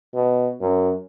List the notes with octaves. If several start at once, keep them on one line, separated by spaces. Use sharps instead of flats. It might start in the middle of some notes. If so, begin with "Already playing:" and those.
B2
F#2